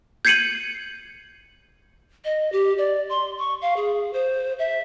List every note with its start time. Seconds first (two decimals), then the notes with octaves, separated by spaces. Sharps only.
0.25 G6 G#6 C7 C#7 D#7 F#7
2.25 D#5
2.52 G4
2.78 D5
3.10 C6
3.39 C#6
3.62 F5
3.76 G#4
4.13 C5
4.59 E5